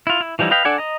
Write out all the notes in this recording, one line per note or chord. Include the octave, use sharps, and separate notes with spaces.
E4 F4
E4
E3 F3 G3 D#4 E4
B4 D#5 F5 G5 B5
D4 A4 D5 F#5 G#5
D#5 A#5